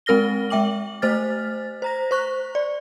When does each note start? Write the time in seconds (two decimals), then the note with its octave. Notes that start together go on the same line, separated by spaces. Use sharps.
0.06 G#3 C4 A#4 F6 A#6 G7
0.50 G#3 E5 G5 D6 F#7
1.02 A3 C5 F6 A6
1.82 C5 A#5 A#6
2.11 C5 C#6 F#6
2.55 D5